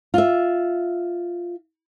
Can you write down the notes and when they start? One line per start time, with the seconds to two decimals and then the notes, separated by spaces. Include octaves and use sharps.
0.14 F4 E5